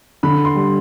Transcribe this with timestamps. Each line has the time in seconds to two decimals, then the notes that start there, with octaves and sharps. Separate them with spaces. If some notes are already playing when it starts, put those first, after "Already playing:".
0.23 D3 B5
0.45 C6
0.55 G3